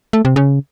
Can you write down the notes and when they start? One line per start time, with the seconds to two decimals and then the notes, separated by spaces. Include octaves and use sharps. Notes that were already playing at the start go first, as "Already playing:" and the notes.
0.13 A3
0.25 C3
0.36 C#3